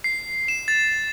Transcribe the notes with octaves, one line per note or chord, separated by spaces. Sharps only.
C7
E7
A6